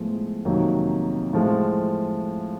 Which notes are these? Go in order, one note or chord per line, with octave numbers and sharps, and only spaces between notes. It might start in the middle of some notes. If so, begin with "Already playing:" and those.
Already playing: A2 F3 G#3 B3
F2 C3 D#3 F#3 A#3
A2 F3 G#3